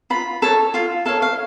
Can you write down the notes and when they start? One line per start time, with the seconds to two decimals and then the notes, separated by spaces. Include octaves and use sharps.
0.10 F4 B5
0.42 A4 C#5
0.74 F4 F5
1.06 A4 C#5 F5
1.22 F5